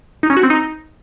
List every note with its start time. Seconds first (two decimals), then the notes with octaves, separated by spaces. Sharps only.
0.23 D#4
0.30 C#4
0.37 F#4
0.43 C4
0.50 D#4